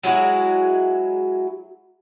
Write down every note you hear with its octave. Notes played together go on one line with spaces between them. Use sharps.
F#3 G#3 E4 F#4